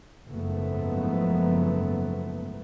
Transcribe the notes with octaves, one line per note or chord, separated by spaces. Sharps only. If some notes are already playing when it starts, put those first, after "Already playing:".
F#1 G#2 F3 F#3 A3 B3